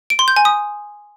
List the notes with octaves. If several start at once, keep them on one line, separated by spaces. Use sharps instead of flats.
D7
C6
G6
G#5
D#6